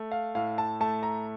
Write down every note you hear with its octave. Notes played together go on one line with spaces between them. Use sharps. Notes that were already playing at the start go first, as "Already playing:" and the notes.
Already playing: A3
F5
A2 F5
A5
A3 A5
A#5